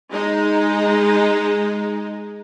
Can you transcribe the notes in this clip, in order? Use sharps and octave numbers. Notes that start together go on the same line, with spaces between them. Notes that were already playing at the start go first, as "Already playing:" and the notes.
G#3 D#4